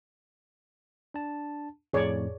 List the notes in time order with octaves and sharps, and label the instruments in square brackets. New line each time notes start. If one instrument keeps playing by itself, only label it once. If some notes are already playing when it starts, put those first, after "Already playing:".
[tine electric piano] D4 A5
[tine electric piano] F2 A2 [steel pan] G#4 C#5 D5